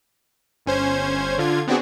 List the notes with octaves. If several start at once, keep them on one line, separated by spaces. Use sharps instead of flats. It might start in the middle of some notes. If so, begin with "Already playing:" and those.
G1 C#4 C5 G#6
D3 F4 G#6
B3 C4 D4 F#4 G#4